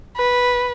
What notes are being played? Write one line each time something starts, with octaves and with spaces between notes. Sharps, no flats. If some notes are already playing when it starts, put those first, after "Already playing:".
B4